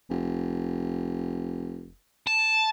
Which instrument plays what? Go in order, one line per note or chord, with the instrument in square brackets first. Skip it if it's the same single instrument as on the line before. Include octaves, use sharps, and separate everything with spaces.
[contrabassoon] F1
[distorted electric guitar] A5